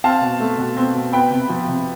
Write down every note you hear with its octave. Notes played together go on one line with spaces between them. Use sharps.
C4 F5 A5
B2
A3
B2
C4
B2
B3 G5 B5
C3
F3
C3